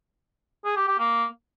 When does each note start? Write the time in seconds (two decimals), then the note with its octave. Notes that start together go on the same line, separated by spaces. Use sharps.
0.65 G#4
0.76 G4
0.88 G4
0.99 A#3